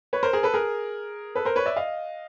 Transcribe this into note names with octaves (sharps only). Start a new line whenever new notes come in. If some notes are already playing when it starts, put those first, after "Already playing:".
B4 C#5
A#4 C5
G#4 A#4
A4 B4
G#4 A#4
A4 B4
A#4 C5
B4 C#5
D5 E5
D#5 F5